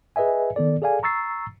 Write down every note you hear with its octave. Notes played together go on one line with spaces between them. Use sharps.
G#4 B4 D#5 E5 G#5
D#3 B3 A4 D5
G#4 A4 D5 F5 G#5
A#5 C#6 E6 A6 C7